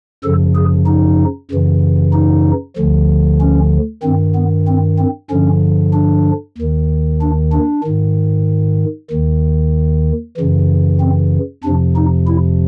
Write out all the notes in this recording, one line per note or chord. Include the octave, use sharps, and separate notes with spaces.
F#2 C#3 F3 A4
G#4
D#4
F#2 C#3 E3
D#4
D2 D3 F3
C#4
G2 D#3 C4
B3
C4
C4
G2 D3 F3 C#4
D4
D#2 D#3
D4
D4
G#2 D#3
D#2 D#3
F#2 C#3 E3
C4
F2 C3 F3 D4
D#4
E4